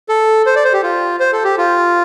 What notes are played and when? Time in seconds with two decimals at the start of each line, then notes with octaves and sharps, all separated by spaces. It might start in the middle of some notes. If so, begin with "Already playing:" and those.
0.09 A4
0.46 C5
0.56 D5
0.65 C5
0.73 G4
0.83 F4
1.20 C5
1.32 A4
1.44 G4
1.58 F4